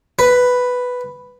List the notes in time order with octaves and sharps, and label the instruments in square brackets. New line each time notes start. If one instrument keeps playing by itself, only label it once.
[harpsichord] B4